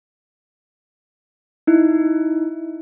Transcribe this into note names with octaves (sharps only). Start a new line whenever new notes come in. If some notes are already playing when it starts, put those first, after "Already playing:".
D#4 E4